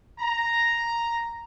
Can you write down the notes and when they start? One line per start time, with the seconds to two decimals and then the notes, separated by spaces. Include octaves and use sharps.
0.19 A#5